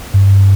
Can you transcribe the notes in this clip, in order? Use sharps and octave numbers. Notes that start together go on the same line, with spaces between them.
G2